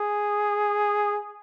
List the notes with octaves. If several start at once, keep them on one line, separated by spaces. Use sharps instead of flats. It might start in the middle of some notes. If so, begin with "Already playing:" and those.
Already playing: G#4